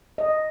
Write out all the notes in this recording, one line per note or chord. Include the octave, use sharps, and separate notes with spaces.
D#5